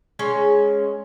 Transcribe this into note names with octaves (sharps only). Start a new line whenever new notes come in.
G#3 C#4 C#5